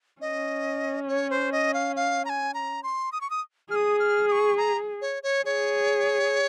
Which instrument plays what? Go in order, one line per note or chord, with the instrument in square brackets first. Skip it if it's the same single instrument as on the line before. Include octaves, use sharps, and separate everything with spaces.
[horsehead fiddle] C#4 [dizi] D#5
[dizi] C#5
C5
D#5
F5
F5
A#5
G#5
A#5
C6
D#6
C#6
D#6
[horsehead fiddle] G#4 [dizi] F6
[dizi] D#6
F6
D#6
C#6
A#5
C#5
C#5
[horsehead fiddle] G#4 [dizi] C#5